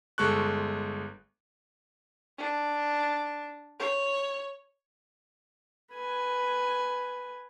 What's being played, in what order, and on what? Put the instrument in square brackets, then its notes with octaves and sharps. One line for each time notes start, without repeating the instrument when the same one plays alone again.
[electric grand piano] G1 G#3 A4 C#6 F#6
[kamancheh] D4
C#5
[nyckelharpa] B4 G#5